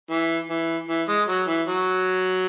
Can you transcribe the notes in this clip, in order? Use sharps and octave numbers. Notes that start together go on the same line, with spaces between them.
E3
E3
E3
G#3
F#3
E3
F#3